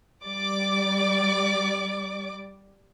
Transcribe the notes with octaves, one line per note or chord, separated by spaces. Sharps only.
G3 D5 D6